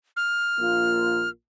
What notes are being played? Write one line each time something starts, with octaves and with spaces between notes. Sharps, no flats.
F6
A#1 A#3 F4